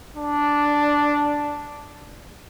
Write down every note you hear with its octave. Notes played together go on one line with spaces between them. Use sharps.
D4